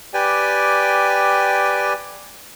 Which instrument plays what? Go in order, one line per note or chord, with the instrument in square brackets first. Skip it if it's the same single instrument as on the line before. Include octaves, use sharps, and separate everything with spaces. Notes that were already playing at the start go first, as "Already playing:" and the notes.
[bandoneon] G4 B4 D5 G5 G#5